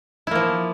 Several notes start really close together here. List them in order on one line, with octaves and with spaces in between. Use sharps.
E4 A#3 F3